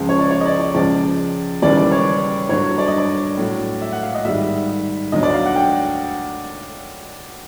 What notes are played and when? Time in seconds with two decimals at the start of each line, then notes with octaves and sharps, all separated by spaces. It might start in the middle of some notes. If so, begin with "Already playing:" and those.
Already playing: C#2 C#3 F3 G#3 F5
0.09 C#5
0.19 D5
0.31 C#5
0.41 D#5
0.46 D5
0.60 D5
0.74 C#2 C#3 F3 G#3 D5
1.62 D#2 C#3 E3 G3 D5
1.77 D5
1.91 C#5
2.49 G2 D3 F#3 C#5
2.78 D5
2.88 D#5
2.98 D5
3.37 A2 F#3
3.82 E5
3.92 F#5
4.03 F5
4.15 D#5
4.24 G#2 D#3 G3 E5
5.12 D2 D3 F#3 D#5
5.23 D5
5.34 F5
5.45 F#5
5.56 G5